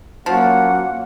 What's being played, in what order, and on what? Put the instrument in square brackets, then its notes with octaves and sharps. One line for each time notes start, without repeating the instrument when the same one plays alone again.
[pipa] F3 [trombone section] F#3 C#4 F#4 [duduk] A#3 [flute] F#5